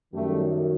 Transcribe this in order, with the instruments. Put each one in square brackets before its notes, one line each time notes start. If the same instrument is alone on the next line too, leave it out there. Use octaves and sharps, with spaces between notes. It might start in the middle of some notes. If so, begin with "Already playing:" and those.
[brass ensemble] F#2 D#3 G3 A3